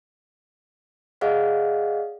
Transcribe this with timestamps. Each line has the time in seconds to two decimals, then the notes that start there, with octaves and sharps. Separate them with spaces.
1.21 G#4 D5 D#5 F5 F#5